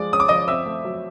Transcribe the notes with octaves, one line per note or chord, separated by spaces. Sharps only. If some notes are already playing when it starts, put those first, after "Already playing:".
Already playing: F3 G#3 D5 D6
C#4 D#6
D6
F3 D#5 D#6
C4 E5 E6
A3
F#3